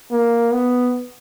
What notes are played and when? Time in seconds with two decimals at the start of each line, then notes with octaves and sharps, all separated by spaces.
0.12 A#3
0.53 B3